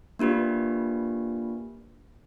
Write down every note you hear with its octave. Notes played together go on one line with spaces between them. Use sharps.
A#3 D4 F4 G4 B4